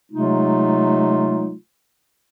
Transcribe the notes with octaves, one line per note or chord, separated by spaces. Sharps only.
C3 F#3 G#3 A3 D#4 F4